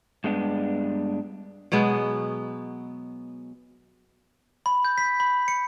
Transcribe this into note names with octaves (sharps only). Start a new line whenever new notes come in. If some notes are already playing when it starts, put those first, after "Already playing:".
G2 G#3 B3 D4
B2 F#3 G#3 B3
B5
G6
B6
B5
C#7